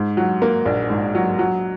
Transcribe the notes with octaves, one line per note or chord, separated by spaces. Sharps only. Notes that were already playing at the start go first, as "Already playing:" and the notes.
Already playing: G#2
F#3
A#3
A#1
G#2
F#3
F#3